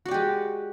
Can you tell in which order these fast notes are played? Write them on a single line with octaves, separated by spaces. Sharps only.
F#4 D5 G4 G#3